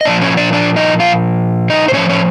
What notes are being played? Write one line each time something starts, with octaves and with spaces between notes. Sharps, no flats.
D#5
A#2 F3 D4 D5
C#4 C#5
D4 D5
D4 D5
D#4 D#5
F4 F5
D#4 D#5
C5
A2 F3 C#4 C#5
C#4 C#5